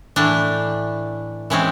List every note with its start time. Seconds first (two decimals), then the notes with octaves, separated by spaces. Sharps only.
0.16 A2 E3 A3 D4
1.50 E3 G#3 C4 C#4